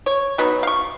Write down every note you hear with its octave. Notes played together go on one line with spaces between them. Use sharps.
C#5
F#3 B3 D#4
F5 C#6